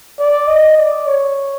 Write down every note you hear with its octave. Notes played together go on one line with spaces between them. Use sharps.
D5
D#5
D5
C#5